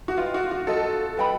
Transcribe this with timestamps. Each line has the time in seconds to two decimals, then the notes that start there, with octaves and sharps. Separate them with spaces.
0.08 F#4
0.17 F4 B4 D#5 G5
0.34 F#4
0.51 F#4
0.67 F#4 A4 A#4 D#5
1.17 B4 D#5 G5 B5